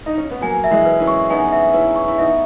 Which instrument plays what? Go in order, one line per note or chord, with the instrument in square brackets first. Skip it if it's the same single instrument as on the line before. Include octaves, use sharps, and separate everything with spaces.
[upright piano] D#4
C#4
B3
[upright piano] F#3 A#3 [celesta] G#5
[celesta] E5
[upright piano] E3 G#3
[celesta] B4
[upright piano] C#4 E4
[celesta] C#6
[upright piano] B3 D#4 [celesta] G#5
[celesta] E5
[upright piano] C#4 E4 [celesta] B4
[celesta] C#6
[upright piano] E4
[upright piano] B3 D#4 [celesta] E5